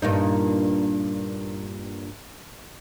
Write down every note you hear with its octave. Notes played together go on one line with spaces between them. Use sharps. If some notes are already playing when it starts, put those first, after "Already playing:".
G2 A#2 D#4